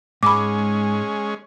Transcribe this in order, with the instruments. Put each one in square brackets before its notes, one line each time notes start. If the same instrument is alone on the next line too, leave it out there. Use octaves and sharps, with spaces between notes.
[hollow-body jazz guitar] G#2 [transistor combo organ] G#3 C#4 [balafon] B5 D6